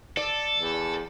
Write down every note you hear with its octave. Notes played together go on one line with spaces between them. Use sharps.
A4 D5
E2